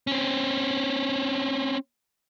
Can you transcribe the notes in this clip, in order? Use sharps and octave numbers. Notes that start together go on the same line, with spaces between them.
C4 C#4